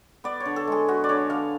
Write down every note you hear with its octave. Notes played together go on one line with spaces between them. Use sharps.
B3 D5
C#5
D3
A4
G#3 G#4
B3 F#4
D5
D3 C#5
D3 F5